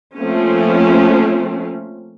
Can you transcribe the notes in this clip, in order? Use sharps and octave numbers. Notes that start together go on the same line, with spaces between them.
F3 A3 A#3 C4 C#4